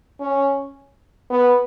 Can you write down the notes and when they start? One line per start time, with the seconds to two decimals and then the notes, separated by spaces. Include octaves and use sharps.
0.20 C#4
1.30 B3